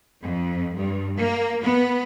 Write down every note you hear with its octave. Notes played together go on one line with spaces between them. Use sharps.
F2
G2
A#3
B3